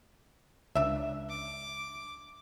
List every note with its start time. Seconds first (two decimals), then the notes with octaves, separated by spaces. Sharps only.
0.75 C#2 D4 E5
1.29 D6